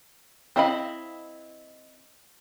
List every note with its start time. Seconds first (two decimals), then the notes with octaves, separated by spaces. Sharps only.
0.56 C4 E4 D#5 F5 B5